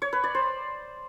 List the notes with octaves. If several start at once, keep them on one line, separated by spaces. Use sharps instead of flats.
C#5
B4
D5
C5